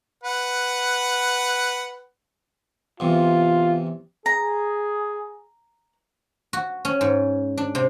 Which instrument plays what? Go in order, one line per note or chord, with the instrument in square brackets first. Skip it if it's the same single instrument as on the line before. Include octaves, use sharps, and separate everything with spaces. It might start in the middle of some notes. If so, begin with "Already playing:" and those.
[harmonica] B4 F#5
[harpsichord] E2 C3 [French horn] F4
[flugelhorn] G#4 [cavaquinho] A#5
[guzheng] F#4
C#4
G#2
D4
C3